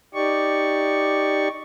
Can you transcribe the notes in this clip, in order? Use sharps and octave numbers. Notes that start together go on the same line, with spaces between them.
D#4 G4 D5 C#6